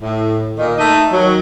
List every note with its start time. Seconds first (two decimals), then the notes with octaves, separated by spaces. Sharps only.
0.02 A2
0.57 A#2 D#3
0.78 A3 D#4
1.12 D#3 F#3